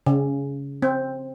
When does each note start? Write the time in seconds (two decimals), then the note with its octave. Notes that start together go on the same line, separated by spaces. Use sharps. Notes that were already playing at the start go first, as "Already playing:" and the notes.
0.06 C#3
0.82 C4